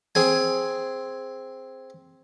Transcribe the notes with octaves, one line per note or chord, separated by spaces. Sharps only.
C4 G#4 G#5